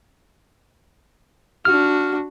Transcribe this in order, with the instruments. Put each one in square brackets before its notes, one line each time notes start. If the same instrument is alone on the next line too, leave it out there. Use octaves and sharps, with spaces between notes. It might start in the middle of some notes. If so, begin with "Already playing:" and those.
[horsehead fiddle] D4 F#4 [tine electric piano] F6